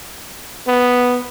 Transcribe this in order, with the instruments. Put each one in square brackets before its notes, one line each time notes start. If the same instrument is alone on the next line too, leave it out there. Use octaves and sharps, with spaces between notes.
[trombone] B3